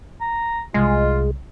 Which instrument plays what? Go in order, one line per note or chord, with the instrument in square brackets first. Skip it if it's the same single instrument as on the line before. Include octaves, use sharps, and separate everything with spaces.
[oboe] A#5
[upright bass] C2 [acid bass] G#3 [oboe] F4